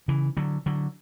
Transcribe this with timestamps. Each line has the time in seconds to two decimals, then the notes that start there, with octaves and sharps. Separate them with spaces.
0.08 C#3 E3
0.37 D3 F#3
0.66 D3 F#3